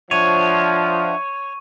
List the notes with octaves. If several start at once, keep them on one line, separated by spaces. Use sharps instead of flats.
F3 D4 C#5 E5 F#5 C#6 D#7